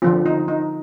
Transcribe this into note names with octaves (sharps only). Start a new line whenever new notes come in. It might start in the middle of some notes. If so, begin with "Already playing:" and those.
D3 F3 C4 F4
D#4
D#4